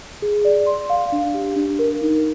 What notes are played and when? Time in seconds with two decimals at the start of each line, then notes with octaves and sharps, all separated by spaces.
0.22 G#4
0.45 D5
0.66 C6
0.90 F5
1.12 D4
1.34 G4
1.56 D4
1.79 A#4
2.02 D#4